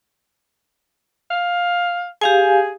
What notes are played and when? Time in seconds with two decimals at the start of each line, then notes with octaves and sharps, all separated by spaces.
1.30 F5
2.22 G4 G#4 F5 G#5